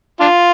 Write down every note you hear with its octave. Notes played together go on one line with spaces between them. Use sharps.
D4 F4